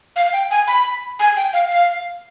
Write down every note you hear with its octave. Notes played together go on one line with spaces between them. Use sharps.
F5
G5
G#5
B5
G#5
G5
F5
F5